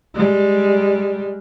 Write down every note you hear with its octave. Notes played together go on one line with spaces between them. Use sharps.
G3 G#3